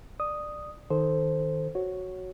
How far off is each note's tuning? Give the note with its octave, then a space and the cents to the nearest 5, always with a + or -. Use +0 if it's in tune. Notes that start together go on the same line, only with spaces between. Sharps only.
D5 +20 D#6 +0
D#3 +0 A4 +0 C5 +0
F#4 +0 C#5 +0